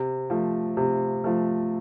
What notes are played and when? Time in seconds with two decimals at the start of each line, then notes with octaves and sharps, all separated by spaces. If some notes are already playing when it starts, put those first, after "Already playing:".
Already playing: C3
0.30 F3 A3
0.77 C3
1.24 F3 A3